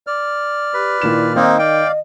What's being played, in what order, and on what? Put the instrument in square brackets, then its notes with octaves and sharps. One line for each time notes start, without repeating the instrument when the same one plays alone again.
[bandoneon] D5 F6
[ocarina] G4 [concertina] B4
[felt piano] A#2 D#3 E7 [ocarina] E4
[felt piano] D#3 [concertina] A#3 C4 D#4 [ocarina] D#5
[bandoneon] D5 F5 [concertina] G5